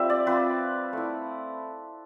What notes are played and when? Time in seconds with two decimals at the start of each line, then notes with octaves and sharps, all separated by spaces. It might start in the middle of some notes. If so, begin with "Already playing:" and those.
Already playing: G3 C4 F4 E5
0.10 D5
0.26 G3 C4 F4 B4
0.93 A3 E4